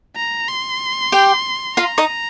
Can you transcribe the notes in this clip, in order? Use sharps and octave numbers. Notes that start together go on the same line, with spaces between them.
A#5
C6
G4 G5
F4 F5 A#5
D#4 D#5